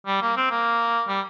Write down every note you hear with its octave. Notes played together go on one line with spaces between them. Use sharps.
G3
A#3
C4
A#3
G3